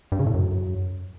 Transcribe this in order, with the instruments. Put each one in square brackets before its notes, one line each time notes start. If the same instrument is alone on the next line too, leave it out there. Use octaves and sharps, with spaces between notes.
[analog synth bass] G2
C#3
A2
F#2